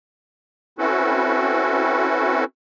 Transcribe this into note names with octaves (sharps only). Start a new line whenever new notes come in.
C4 C#4 E4 F#4 A4 B4